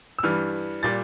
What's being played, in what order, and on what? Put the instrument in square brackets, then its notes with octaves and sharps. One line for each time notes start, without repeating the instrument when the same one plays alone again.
[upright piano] E6
G2 E3 G3 F6
A#2 G3 A6